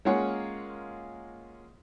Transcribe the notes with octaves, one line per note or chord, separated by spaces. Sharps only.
G#3 A#3 C#4 F4 C#5 F#5